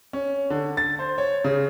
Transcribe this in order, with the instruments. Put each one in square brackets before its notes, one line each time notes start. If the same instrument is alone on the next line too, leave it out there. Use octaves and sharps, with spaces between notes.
[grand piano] C#4
D3
A6
C5
C#5
C#3